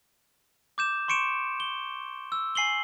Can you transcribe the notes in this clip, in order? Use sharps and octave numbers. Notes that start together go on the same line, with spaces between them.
D6 G6 E7
C6 C#6 C#7 D7 E7
G7
E6
G#5 C7 F#7 G7